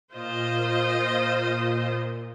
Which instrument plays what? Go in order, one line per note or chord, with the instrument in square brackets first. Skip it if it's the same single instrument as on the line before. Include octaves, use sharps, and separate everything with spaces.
[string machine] A#2 [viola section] F4 C5 D#5